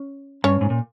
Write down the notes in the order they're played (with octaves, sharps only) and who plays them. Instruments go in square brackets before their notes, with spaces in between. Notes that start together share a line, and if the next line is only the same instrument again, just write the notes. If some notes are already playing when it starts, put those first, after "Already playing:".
Already playing: [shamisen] C#4
[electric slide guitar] G2 [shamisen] C#4 C#5
[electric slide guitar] G#2
A#2